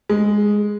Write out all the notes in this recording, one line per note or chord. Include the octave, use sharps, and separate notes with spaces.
G#3